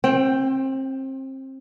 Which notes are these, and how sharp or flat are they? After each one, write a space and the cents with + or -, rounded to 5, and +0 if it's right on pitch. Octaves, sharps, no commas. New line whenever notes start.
C4 +30 G5 +0